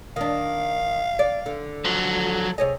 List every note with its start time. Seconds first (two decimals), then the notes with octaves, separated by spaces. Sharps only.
0.16 D#3 D4 F5
1.19 D5
1.46 D3
1.85 F3 F#3 A4
2.58 C3 G#4 C#5 D#5